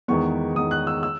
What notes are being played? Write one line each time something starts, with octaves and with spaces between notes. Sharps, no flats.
E2 D#3 G#3 B3 C#6
E2 D#3 G#3 B3 D#6
F#6
E6
E6